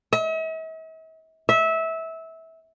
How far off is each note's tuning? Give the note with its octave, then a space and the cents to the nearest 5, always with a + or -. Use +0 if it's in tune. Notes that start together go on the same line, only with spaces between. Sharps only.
E5 -45
E5 -20